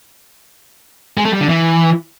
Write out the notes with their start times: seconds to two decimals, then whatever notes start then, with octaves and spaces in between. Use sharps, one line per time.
1.17 G#3
1.25 A3
1.33 G3
1.41 D3
1.49 E3